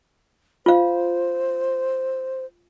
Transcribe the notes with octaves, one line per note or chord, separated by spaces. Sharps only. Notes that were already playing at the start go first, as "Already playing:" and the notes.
F4 C5 F5